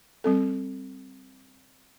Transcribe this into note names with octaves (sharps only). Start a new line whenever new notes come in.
G3 C4 A4